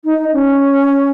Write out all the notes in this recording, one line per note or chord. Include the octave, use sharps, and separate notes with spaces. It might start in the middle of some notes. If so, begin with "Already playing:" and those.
D#4
C#4